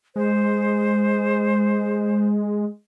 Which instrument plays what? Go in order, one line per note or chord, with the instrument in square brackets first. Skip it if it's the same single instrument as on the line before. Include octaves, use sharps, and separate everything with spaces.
[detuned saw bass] G#3 [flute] C5